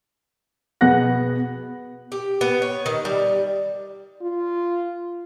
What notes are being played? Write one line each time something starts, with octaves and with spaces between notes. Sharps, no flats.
B2 B3 G#4 F#5 F#6 A#6
G4
B3
C#5
D#3
G3
F4